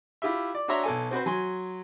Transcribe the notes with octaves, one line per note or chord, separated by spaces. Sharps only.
E4 F4 G4 E5
D5
D4 F#4 C#5 E5 A#5 C6
B1 A4 G#5
C4 F#4 B4 C5
F#3 G#5 C6